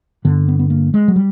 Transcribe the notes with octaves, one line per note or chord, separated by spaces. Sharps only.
G2 D3 B3
B3
B3
A#3
G#3
F#3
G3